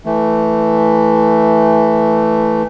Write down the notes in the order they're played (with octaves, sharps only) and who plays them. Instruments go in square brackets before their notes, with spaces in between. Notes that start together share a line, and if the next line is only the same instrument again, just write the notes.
[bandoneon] E3 A3